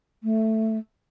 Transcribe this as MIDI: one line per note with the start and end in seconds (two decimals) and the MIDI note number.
0.23 0.78 57